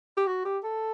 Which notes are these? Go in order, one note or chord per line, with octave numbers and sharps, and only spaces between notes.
G4
F#4
G4
A4